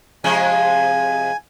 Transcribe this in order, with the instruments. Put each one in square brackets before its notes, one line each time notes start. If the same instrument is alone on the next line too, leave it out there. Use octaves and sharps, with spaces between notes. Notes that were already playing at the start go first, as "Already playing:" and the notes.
[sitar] C3 F3 G#3 [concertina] G#5